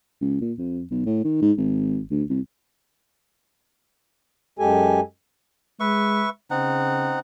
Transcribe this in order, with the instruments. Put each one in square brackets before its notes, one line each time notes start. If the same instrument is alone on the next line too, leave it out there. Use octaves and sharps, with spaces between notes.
[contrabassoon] C#2
A#2
F2
B1
A2
D#3
G#2
G#1
D2
C2
[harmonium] F#2 G#3 G4 A4 G#5
[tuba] G#3 [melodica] B4 E5 C#6
[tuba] C#3 [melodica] C4 D#4 F#5